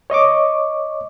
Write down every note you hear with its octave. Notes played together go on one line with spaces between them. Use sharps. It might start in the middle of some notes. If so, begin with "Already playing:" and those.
C#5 D#5 C#6 D6